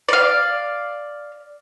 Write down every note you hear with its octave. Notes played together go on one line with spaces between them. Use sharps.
D5 F5